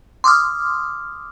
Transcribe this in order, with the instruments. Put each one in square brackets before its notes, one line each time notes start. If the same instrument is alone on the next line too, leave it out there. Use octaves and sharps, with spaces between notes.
[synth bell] C6 D6 D#6 F6